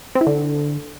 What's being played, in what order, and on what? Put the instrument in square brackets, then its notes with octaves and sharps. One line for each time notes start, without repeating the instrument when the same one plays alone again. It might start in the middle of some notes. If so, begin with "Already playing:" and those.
[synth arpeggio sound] C4
E4
D3